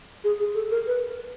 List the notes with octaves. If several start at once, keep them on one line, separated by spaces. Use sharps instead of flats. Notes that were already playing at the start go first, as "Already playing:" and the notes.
G#4
G#4
A4
A#4
B4